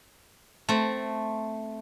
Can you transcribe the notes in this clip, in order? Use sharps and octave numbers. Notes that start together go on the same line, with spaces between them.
A3 C4